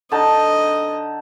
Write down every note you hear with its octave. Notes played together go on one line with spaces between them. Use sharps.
D3 D#4 D#5 A5